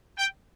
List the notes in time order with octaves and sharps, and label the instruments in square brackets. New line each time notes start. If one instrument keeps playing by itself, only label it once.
[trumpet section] G5